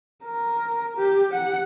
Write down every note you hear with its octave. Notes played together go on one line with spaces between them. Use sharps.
A#4
G4
F#5